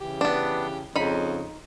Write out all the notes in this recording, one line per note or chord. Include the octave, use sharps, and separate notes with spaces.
C#3 E3 G4
B3 D4
F2 C#3 D#4 B5